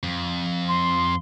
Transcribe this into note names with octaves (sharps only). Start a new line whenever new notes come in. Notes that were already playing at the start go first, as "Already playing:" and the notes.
F2
C6